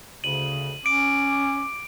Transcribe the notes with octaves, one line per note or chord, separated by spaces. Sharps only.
D2 C#3 D#7 F#7
C#4 D6 D7